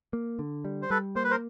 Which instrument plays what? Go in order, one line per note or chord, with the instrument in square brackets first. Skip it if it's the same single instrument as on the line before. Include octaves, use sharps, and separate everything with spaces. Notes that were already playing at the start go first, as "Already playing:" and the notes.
[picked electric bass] A#3
D3
G3
[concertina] C5
[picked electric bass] G3 [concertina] A4 B4
[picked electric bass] A#3 [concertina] C5
[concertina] B4
A#4 C5